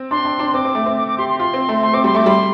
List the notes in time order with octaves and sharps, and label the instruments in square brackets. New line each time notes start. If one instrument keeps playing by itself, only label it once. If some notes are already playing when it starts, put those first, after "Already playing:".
Already playing: [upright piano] C4
[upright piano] D4 [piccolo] C6
[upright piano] D4
D4
[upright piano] C4 [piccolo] D6
[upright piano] C4
A3
C4
[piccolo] D6
D6
[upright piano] G4 [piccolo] C6
[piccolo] C6
[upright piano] F4 [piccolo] C6
[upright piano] C4
A3
[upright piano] A3 [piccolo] C6
[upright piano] C4 [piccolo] D6
[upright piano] G3 [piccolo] C6
[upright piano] A3 [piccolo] D6
[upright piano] G3 [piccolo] C6